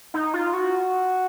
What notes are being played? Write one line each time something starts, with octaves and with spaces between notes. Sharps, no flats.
D#4
F4
F#4